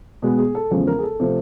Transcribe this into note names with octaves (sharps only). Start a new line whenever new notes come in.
B2 G#3 B3
G#4
A4
E2 C#3 F3 G#3
A#4
G#4
A4
C3 F3 A3 C4